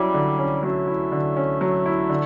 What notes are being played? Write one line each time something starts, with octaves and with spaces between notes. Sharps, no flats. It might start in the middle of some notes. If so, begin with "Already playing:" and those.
Already playing: F#3 G3 C#4 E4
D3
C#4
F#3 A3
E4
D3
C#4
F#3
E4
D3